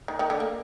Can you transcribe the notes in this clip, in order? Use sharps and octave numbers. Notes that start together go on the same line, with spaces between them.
D#3
D#3
D3
A#3